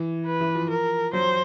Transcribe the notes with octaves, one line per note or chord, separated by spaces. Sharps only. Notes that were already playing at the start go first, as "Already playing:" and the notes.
Already playing: E3
B4
E3
F3
A#4
F#3 C5